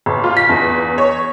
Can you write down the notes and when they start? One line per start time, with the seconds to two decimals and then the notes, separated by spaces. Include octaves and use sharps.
0.06 A1
0.24 F4
0.37 B6
0.49 E2
0.98 C#5